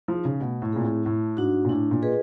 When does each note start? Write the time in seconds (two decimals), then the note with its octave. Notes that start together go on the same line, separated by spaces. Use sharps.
0.08 F3 D#4 G#4
0.25 C#3
0.41 B2 A3
0.62 A2
0.73 A#2 C4 E4 G#4
0.84 A2
1.05 A2 A3
1.37 G#2 D4 F#4
1.65 A#2
1.69 A2 D4
1.91 A#2
2.02 F4 G#4 B4 D#5